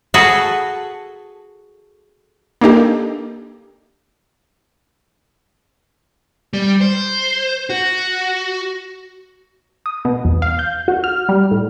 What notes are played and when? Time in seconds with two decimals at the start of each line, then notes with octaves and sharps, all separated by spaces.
0.14 F#4 G#4 A4 B4
2.61 A#3 D4 D#4 G4 A4
6.53 G3
6.81 C5
7.70 F#4
9.86 D#6
10.05 B2
10.25 E2
10.42 F5
10.59 G6
10.88 F#4
11.04 F6
11.29 G3
11.51 A2